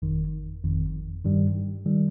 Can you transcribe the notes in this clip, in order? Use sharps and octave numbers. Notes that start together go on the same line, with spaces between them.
G1 F2 D#3
G1 F2 D#3
G2 D#3 G3
D#3 G3